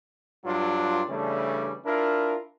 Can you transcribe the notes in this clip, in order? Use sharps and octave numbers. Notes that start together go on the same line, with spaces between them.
G2 F#3 D4 F4
C#3 E3 G3 A3 C#4 D4
D4 E4 F4 A#4